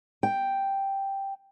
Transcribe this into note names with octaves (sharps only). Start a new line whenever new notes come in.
G5